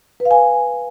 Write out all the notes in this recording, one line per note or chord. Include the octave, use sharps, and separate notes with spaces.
B4
F5
G#5